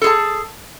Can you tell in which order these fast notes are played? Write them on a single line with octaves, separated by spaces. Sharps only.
A4 G#4 A5